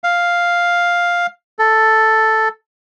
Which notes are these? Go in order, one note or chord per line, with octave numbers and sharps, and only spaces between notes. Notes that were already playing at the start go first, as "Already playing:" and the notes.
F5
A4